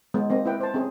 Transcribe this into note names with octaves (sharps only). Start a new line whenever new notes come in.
G#3 B3
A#3 C4 D#5
E4 B4 G5
C5 A5
C4 C#4 G#4